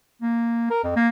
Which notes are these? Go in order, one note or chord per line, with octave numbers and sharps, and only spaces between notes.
A#3
A#4
F2
A#3